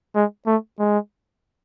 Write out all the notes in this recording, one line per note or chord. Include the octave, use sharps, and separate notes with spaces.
G#3
A3
G#3